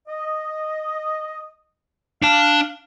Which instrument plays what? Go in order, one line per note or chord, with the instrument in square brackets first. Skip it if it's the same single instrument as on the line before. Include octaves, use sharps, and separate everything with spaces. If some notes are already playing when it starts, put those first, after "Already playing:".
[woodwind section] D#5
[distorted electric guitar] D4 A5 [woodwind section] F5